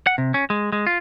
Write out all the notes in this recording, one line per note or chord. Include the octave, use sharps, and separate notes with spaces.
F#5
C3
C#4
G#3
G#3
F4